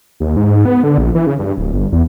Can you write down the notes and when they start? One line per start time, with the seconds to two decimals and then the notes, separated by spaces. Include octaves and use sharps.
0.20 D#2
0.36 G#2
0.65 B3
0.83 D3
0.98 A#1
1.15 E3
1.27 C#3
1.39 G2
1.58 D1
1.73 G1
1.92 E2